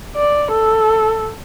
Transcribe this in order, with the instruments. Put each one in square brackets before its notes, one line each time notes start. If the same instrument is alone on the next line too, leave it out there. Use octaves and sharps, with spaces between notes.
[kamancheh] D5
A4